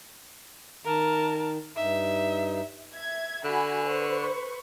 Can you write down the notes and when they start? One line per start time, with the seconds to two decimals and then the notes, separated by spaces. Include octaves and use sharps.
0.85 D#3 A#4 A5
1.76 G2 D#4 E5
2.93 E5 G#6
3.44 D3 F#4 G#5 B5
3.86 B4 C5 C#6